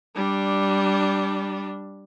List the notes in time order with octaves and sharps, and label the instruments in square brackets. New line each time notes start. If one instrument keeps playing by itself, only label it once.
[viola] G3 D4